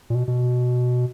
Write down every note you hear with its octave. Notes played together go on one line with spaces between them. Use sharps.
A#2
B2
B2